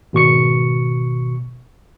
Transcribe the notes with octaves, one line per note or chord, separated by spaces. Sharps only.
G#1 B2 C#6 C#7